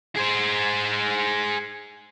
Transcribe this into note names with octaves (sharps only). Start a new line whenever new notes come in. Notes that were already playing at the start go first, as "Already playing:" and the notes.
G#4 C5